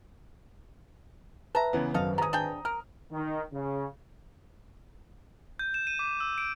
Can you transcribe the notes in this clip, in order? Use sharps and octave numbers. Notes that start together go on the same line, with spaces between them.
B4 E5 A5 A#5
C#3 E3 B3
G#1 F#2 A4 D#5 F5
B3 C#4 A#5 D#6
D4 G#4 G5
A#4 F6
D#3
C#3
G6
E7
D#7
D6
E6
D7